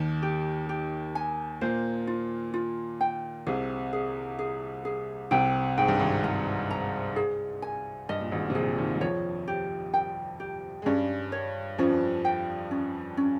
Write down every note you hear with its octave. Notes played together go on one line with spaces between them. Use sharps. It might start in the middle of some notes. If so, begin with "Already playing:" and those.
Already playing: D#2 D#3
G4
G4
G#5
A#2 A#3 C5
F4
F4
G5
C2 C3 G#4
G#4
G#4
G#4
C2 C3 G5
G#2 G5
G2
G#1 G#2
G2 A#5
A#5
G#4
G#5
G2 D#5
A#2
G#1 G#2
C3
A#1 A#2 G#4
D#2 D#3
G3
F2 F3 C#5
G4
G5
G4
G#3
G2 G3 C#4
C#5
F2 F3 C#4
G5
C#4
C#4